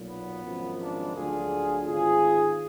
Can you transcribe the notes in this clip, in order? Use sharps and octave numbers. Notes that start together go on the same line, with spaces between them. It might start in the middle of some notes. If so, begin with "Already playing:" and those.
Already playing: B1 A#2 F#3
B3
G#1 F#2 F3 G#3
A#3 D4
D2 D3 F#3 F4 G#4
G#1 G#2 D#3 F4 G#4